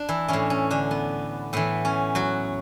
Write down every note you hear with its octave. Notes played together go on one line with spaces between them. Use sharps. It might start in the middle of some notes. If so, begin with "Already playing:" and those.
Already playing: D4
E3 E4
A2 E3 C#4
C#4
D3 D4
B3
A2 E3 B3
C#4
F#3 F#4